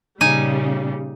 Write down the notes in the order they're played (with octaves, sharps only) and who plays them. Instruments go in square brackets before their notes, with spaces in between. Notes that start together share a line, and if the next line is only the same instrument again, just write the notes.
[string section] A#2 C#3 G3 [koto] D#4 G#5